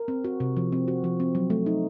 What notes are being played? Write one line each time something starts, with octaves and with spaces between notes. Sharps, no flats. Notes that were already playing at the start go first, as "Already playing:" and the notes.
Already playing: A#4
C4
F#4
C3
F3
C4
F#4
F3
C4
F#3
A3
D#4